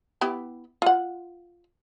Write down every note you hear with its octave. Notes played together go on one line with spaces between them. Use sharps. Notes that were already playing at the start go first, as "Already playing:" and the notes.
B3 E4 G4
F4 F#5